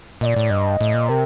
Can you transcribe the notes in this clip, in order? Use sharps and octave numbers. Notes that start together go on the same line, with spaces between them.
A#2 D5 D#5
A2
G2 D#5
A2
A#2
C3 A#4